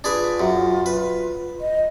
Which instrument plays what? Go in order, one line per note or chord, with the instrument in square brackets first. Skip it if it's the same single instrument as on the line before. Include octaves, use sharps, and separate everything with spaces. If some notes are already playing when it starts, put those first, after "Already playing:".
[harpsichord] D4 G#4 B4 [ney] F4
[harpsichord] F#2
B4
[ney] D#5